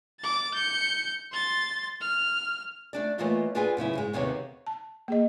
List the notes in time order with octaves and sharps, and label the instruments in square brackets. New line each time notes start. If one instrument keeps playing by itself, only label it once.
[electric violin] D6 A6
G6 C#7
C6 A6
F6
[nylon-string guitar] A3 D4 D5
E3 A3 A#3 F4 C#5 D#5
D4 F4 G#4 B4 F#5 G#5
F#2 C#3 B3 E4
G#2 G#3
D#2 C3 D#3 B3 C#5
[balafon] A5
A#3 G#4 D#5